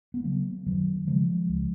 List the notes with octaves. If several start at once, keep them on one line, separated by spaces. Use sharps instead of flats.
B3
C#3 F#3 A#3
F#2 D#3 F#3
C#3 F3 G#3
C#2